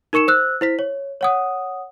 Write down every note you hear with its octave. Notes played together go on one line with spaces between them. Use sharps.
D#4 A#4 C#6 C#7 E7
C5 E6 F#6
E4 C5 B6
C#5
C#5 F#5 D#6